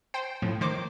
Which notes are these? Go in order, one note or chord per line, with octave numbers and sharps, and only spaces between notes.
C5 G5
A2 F3
D#3 C5 D6